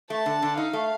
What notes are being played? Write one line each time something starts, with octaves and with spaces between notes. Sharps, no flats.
A3 A5
D3
D3
D#4 F5
A3